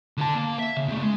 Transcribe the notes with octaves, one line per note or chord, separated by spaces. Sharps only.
D3 A5
A#3
E5
C#3
E2 A3
G#3